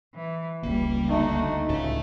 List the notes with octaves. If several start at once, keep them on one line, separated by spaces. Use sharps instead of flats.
E3
F1 C#2 G3 A#3
D2 A3 D#4 F#4
C#2 A2 C#3 A4 E5